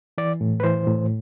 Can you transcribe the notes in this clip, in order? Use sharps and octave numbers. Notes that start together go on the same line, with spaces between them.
E3 D5
A2
B4
E3 C5
A2